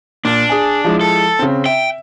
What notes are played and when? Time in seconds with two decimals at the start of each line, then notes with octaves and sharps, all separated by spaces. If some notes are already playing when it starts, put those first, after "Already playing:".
0.25 A#2 D4
0.49 G#4 D5 G#5
0.84 F3 G#3 E4
1.01 A4
1.39 C#3 C4
1.66 E5 G5